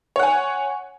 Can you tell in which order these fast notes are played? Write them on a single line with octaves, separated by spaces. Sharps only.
C#5 F#5 G#5